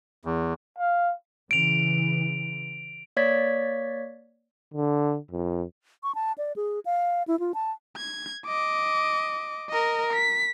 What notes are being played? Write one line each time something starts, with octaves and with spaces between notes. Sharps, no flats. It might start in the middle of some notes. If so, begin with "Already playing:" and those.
E2
F5
C#3 E3 D7 F7
A#3 C#5 D5 G#6 B6
D3
F2
C#6
A5
D5
G#4
F5
E4
F4
A5
G#6
D#5 D6
A#4 D#5
B6